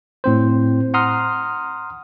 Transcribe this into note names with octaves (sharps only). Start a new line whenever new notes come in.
A2 C4 C5
F#5 A#5 C6 D#6 F6